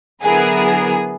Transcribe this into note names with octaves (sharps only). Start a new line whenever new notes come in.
D3 F#3 B3 E4 G#4 A#4